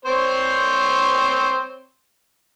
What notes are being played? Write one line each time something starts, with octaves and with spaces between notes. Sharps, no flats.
C4 C5 C#5